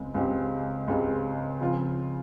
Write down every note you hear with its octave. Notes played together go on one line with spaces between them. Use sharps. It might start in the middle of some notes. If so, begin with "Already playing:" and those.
Already playing: C#2 C#3 G#3 C4
C#2 C#3 G#3 C4 G4
C#2 C#3 G#3 C4 G4
C#3 F3 C4 F4